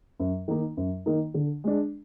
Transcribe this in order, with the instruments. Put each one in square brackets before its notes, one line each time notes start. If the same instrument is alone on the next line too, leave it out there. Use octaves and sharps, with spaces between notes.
[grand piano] F#2
D#3 A#3 D#4
F#2
D#3 A#3 D#4
D3
G#3 D4